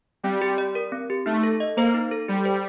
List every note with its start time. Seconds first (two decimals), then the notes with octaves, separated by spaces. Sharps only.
0.24 G3 C4
0.42 G4
0.58 D5
0.75 A#4
0.92 C4
1.10 G4
1.26 A3 D#4
1.43 A4
1.60 D#5
1.77 A#3 C5
1.94 D#4
2.11 A4
2.28 G3 G4
2.45 C5